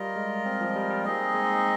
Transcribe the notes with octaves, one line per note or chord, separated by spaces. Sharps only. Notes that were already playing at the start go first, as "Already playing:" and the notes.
Already playing: G3 F4 A#4 D#5
G#3
C4
F3
G3
G3
A#3 C4 D#4 G#4 D#5
G#3